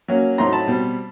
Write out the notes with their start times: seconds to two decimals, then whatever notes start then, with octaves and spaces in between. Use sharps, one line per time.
0.08 F#3 A#3 C#4
0.38 A2 F#3 A3 C4 D#4 A#5 C6
0.53 A5 B5
0.67 B2 G3 C4